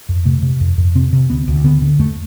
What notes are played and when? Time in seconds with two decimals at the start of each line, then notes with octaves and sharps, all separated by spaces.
0.09 F2
0.25 C3 A3
0.42 C3
0.60 F2
0.78 F2
0.95 C3 C4
1.13 C3
1.30 D2 B3
1.48 D2
1.64 D3 B3
1.82 D3
1.99 E2 A3